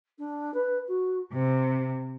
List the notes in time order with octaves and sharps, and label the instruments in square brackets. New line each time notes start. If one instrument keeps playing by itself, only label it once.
[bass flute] D4
B4
F#4
[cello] C3 [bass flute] C4